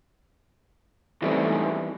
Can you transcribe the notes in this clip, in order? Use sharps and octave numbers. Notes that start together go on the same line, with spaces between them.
C#2 G#2 E3 G3 A3 C4